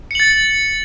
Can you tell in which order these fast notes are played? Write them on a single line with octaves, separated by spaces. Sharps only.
C#7 F#7 A6